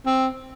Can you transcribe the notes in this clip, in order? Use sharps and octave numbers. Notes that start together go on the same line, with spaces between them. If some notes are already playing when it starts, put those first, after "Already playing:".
C4